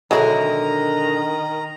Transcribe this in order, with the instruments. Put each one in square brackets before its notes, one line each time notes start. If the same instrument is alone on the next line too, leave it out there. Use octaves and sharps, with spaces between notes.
[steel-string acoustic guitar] B2 D3 A#4 [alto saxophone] D#3 [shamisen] F#3 G#3 E4 [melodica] A#5